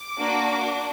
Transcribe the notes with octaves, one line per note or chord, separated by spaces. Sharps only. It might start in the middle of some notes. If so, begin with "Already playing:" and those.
Already playing: D6
A#3 D4 F#4
D4